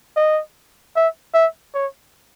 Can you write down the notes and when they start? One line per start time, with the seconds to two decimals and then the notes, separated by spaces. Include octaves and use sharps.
0.17 D#5
0.96 E5
1.34 E5
1.74 C#5